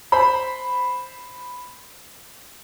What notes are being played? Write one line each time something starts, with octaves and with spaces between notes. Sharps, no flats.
C5 B5